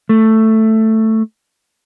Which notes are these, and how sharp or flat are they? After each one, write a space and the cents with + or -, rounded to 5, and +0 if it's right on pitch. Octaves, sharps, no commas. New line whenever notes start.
A3 +5